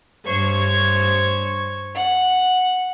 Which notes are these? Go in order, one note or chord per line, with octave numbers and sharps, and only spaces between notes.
G2 C5 C#5 C#6 G#6
F#5